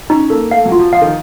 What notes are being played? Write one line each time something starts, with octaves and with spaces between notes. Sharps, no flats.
C#4 D#4
A#3 A4
A3 F5
F#3
F4
F3
F3 F5
D#3